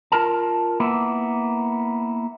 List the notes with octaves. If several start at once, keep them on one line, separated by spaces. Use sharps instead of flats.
F4 A#4 A5
A#3 B3 E4